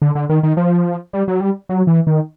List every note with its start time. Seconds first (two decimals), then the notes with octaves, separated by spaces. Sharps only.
0.02 D3
0.15 D3
0.29 D#3
0.43 D#3
0.57 F3
1.13 G3
1.28 F#3
1.41 G3
1.69 F#3
1.87 E3
2.07 D#3